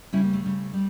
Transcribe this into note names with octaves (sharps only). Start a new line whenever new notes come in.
C#3 G3 C#4 E4
A#3
A3
C#3 G3
G3